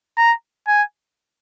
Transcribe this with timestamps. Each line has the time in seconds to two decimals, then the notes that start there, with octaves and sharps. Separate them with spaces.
0.18 A#5
0.68 G#5